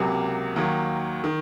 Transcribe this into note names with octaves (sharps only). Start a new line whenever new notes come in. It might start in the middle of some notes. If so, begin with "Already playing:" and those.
Already playing: C#2 C3 F#3 A#3
D#2 D#3 F#3 A#3
D#3